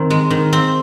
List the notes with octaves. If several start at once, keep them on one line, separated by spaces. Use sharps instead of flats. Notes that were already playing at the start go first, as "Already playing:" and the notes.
Already playing: D#3 C4
G#3
D#3
C4